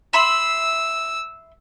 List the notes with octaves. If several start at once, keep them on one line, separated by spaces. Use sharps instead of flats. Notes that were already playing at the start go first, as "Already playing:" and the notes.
E5 B5 C6 E6